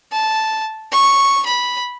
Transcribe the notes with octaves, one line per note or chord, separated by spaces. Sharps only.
A5
C#6
B5